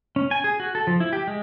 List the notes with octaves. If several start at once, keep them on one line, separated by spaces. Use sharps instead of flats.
C#4
G#5
G#4
F#4
A4
F3
E4
G4
G#3